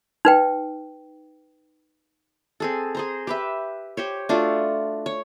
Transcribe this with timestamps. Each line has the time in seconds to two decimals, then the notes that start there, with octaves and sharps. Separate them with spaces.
0.25 D#4 B4 G5
2.60 C4 G#4 A4
2.95 G#4 C5 A#5
3.27 G4 B4 E5
3.97 G4 C5 C#5
4.29 A3 D4 F4 F#4
5.06 C#5